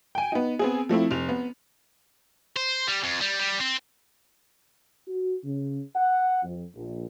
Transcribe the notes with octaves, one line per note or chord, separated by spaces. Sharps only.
G5 G#5
B3 D#4
B3 C4 G#4
F3 A3 C4 E4
F1 F7
B3
C5
G3
F2
G3
G3
C4
F#4
C#3
F#5
F2
A#1